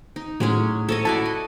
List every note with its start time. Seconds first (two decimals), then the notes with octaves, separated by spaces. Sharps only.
0.16 D#4
0.40 A2 F#3 G#3 C#4
0.89 A4 C#5 D#5
1.05 E4 F#4 D5 A5
1.26 D#5